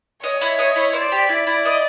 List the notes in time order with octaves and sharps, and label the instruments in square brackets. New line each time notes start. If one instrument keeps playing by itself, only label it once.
[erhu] C#5 [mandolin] D#5
[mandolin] E4
D#5
E4
[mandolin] C5 [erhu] D5
[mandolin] G4
E4
E4
D#5